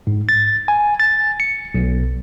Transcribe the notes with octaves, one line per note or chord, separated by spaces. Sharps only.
G#2
A6
G#5
A6
C#7
B1